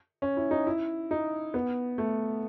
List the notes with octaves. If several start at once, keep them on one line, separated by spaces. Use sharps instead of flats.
C#4
E4
D#4
E4
D#4
B3
A3